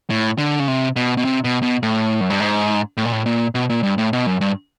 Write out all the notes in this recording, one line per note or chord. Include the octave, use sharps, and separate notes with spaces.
A2
D3
C#3
C3
B2
B2
C3
B2
B2
A2
F#2
G2
G#2
A2
A#2
A2
A#2
B2
A#2
G2
A2
B2
F#2
G2